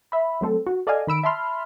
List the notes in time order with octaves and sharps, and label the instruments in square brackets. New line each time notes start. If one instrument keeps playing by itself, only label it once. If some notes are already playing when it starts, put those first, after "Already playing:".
[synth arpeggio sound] E5 B5
F#3 A3 C4 A4
F#4
A4 D5 D#5 F5 G#5
D#3 B5 E6 D7
E5 A5 B5 C6 F6